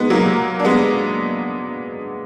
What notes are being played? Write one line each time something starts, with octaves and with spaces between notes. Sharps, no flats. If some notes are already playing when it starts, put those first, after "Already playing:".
Already playing: G#3 B3 D#4
F#3 A#3
D4
G#3 B3